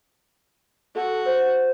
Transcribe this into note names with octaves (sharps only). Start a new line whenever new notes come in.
F#4 A4
C5